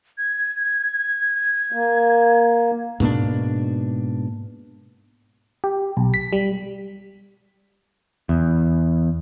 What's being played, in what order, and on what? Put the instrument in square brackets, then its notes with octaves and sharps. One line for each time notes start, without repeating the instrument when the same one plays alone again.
[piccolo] G#6
[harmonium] A#3
[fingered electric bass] G#2 B2 A#3 D4
[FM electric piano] G4
B1
B6
G3
[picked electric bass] E2